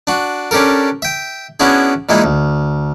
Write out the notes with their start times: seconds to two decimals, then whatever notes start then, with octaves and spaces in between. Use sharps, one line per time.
0.07 D4 F#4
0.51 C#4 D4 G4 A4 A#4
1.02 E5 G5
1.60 B3 C#4 D4 E4 F#4 G#4
2.09 A#2 E3 G#3 D#4 E4
2.24 D2